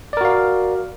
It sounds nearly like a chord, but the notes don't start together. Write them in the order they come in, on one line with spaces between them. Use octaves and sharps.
D5 A#4 F#4 F5